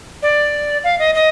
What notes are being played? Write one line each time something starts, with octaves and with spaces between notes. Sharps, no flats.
D5
F5
D#5
D#5